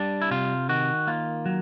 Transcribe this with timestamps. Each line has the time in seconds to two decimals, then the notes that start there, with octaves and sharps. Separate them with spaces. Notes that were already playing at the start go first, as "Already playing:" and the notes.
Already playing: G3 D4
0.22 E4
0.31 C3 F4
0.69 D#3 F#4
1.07 A#3 F4
1.46 F#3